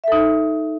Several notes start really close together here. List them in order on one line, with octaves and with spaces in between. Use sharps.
E5 A4 D#4